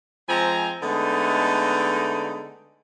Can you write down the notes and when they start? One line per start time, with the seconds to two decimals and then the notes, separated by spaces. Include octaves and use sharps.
0.28 F3 G#3 C4 G#5 A#5
0.83 D3 G#3 A3 B3 D#4